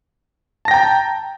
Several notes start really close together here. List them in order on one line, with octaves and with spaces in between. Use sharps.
A5 A#6 G5 A#5